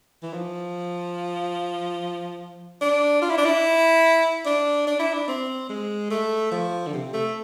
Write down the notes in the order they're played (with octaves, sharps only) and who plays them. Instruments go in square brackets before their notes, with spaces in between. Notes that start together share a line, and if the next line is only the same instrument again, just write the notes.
[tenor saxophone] E3
F3
D4
F4
E4
D4
E4
D4
D4
E4
D4
C4
G#3
A3
F3
D3
C3
A3